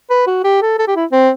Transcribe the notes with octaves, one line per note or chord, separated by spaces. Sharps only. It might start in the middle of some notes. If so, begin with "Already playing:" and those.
B4
F#4
G4
A4
A4
G4
E4
C4